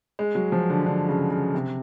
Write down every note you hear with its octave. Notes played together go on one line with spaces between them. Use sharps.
G#3
F#3
F3
D3
D3
C#3
C#3
C3